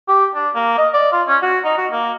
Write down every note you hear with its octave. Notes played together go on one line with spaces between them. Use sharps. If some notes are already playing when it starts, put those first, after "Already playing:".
G4
D4
A#3
D#5
D5
F4
C#4
F#4
D#4
F#4
A#3